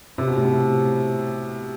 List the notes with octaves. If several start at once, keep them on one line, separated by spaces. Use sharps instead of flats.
C3
B2
A2
B2